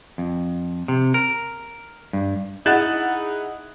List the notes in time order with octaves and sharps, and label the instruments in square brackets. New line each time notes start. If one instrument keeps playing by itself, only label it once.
[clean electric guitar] F2
C3
A#4
G2
[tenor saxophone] D#4 [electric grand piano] E4 [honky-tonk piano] G#4 F#5 [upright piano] F#6 A6 E7